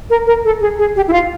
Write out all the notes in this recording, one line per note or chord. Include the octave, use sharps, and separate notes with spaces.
A#4
A#4
A4
G#4
G#4
G4
E4
F4